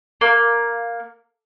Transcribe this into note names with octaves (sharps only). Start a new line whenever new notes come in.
A#3